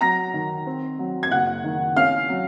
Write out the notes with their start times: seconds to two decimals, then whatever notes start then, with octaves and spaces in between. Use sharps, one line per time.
0.01 F#3 A#5 A#6
0.34 D#3
0.66 C4
0.99 F#3
1.23 G#6
1.31 F#1 F#5 F#6
1.64 D#3
1.97 C#4 F5 F6
2.29 F#3